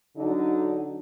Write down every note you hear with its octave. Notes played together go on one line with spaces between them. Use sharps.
D3 F#3 D4 D#4